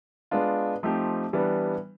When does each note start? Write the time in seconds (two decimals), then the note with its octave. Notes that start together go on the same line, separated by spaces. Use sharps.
0.31 G#3 B3 D4 F4
0.83 F3 A3 C4 D#4 G4
1.33 E3 G3 B3 D4